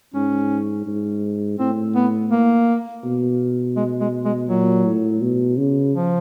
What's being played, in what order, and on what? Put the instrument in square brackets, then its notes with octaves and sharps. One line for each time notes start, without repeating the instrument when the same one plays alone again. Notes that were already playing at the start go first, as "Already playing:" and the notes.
[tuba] G#2 [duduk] C#4
[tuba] G#2
[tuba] A2 [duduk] C4
[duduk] B3
A#3
[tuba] B2
[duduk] G#3
G#3
G#3
[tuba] A#2 [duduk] F#3
[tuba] A2
B2
C#3
[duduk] F3